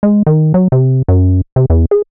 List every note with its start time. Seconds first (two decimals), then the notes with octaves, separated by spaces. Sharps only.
0.03 G#3
0.27 D#3
0.54 F#3
0.72 C3
1.08 F#2
1.56 C3
1.70 E2
1.91 G#4